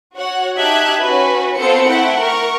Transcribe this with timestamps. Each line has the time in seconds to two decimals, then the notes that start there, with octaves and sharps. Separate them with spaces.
0.15 F#4 C#5 F#5
0.57 D#4 G4 E5 A5 F#6 G#6
1.02 C#4 F#4 B4
1.57 B3 C4 F4 A4 C5 C#7
1.89 A3 E4 F#5 G5
2.21 A#4 C#6